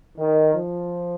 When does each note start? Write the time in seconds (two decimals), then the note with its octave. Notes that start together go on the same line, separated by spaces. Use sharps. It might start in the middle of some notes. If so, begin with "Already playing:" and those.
0.18 D#3
0.54 F3